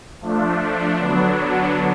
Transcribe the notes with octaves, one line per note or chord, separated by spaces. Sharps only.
F3 A3 D4
D3 F#3 B3 D4